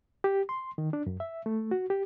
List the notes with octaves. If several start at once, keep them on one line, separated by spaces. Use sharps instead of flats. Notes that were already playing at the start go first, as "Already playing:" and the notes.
G4
C6
D#3
D4
F#2
E5
A3
F#4
G4